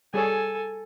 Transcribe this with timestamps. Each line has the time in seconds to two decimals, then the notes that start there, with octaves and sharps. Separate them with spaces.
0.14 G3 G#4 A4 C#5 G#5